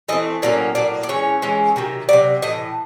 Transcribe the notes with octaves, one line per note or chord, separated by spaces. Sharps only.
E3 A3 C4 D#5
A2 F#3 A#3 C#4 D5
A2 F#3 A#3 D5
D5
E3 G#3 C#4 C#5
E3 G#3 C#4
C3 D#3 F#3
C3 D#3 F#3 D5
A2 E3 D#5